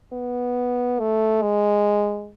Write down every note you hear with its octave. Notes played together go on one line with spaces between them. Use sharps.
B3
A3
G#3